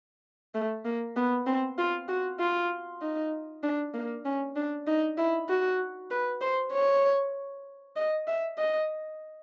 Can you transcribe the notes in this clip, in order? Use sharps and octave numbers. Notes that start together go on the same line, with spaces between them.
A3
A#3
B3
C4
F4
F#4
F4
D#4
D4
A#3
C#4
D4
D#4
E4
F#4
B4
C5
C#5
D#5
E5
D#5